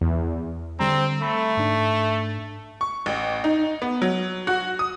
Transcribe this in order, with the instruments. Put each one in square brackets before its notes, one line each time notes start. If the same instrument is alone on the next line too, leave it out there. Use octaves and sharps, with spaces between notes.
[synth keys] E2
[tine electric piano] D3 G3 A#5 [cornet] C4
[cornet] A3 [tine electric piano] B5
[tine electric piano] G#2 D4
[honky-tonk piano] C#6
A1
D#4
B3
F#3
F#4
D#6